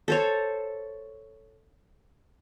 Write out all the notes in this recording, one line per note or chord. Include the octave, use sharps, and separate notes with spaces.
A4 C5 C#5